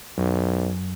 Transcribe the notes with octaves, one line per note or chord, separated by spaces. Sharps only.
B1 F#2